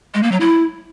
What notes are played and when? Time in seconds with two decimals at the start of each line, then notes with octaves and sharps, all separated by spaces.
0.14 G#3
0.23 A#3
0.32 F#3
0.40 E4